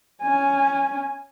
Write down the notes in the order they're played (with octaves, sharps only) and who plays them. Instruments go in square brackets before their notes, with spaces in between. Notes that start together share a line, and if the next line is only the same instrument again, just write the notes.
[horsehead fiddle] C#4 G#5